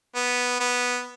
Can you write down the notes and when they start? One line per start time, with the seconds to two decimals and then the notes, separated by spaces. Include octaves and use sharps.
0.15 B3
0.60 B3